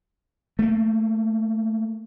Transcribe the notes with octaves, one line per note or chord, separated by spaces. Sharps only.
A3 A#3